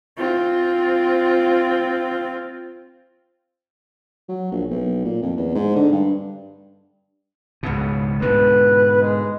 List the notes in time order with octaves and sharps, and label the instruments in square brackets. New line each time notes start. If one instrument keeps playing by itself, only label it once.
[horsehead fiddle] C4 F4
[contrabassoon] F#3
A#1
B1
A#2
F2
E2
G#2
D3
G2
[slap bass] C#2 G#2 B2
[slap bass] G#2 B2 D3 [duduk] B4
[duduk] G#3